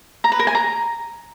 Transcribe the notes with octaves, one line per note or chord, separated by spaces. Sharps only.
A#5
B4
A#4
G#5
A#5